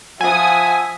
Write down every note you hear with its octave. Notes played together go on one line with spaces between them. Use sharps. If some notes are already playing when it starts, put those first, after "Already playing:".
F3 E5 F#5 G#5 D#6